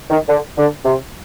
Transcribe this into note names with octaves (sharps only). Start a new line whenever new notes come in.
D#3
D3
D3
C3